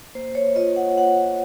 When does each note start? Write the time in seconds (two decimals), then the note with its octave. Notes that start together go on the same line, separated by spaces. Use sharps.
0.15 A#3 C5
0.35 C#5
0.55 F4 D#5
0.76 F#5
0.98 A#3 F#5